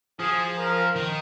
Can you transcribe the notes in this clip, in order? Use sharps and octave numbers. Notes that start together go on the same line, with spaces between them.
F3 G#4
A#4
D#3